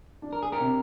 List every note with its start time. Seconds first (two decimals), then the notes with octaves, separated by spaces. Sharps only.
0.22 D4
0.33 A#4
0.43 G#4
0.52 G4 A#4
0.60 C3